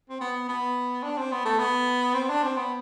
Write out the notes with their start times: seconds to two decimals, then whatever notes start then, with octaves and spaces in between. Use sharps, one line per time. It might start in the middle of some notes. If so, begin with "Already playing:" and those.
0.09 C4
0.21 B3
0.48 B3
1.03 D4
1.17 C4
1.32 B3
1.45 A3
1.59 B3
2.14 C4
2.29 D4
2.43 C4
2.57 B3